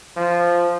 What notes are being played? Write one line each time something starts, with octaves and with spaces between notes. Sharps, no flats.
F3